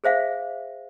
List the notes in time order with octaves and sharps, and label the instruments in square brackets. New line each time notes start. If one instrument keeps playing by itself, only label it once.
[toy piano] G#4 C5 E5 F5